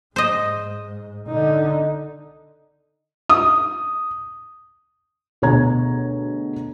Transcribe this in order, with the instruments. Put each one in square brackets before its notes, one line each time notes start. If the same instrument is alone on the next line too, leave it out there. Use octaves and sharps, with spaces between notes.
[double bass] G#2 [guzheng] C5 D#5
[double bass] D3 D#4
[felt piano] D#6
D2 B2 G#4 C#5 A#5 G#6